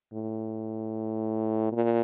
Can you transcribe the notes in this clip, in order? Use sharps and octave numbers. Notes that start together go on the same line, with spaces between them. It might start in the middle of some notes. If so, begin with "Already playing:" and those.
A2
A#2